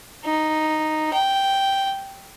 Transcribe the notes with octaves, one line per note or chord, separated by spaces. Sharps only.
D#4
G5